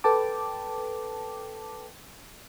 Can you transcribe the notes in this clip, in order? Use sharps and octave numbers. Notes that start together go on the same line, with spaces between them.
A4 B4 G5 A5 D6